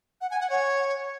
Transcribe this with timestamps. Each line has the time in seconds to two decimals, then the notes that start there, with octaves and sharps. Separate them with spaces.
0.21 F#5
0.31 G#5
0.40 F#5
0.50 C#5